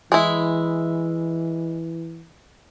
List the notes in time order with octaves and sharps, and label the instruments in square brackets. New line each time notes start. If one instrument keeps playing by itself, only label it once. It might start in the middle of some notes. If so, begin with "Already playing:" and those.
[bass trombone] E3 [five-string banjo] G#3 E4